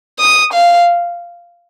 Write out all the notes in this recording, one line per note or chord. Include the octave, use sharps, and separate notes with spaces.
D#6
F5